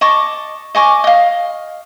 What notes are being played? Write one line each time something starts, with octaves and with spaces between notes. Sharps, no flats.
D#5 A5 C#6 D6
D#5 G#5 C#6 D6
D#5 F5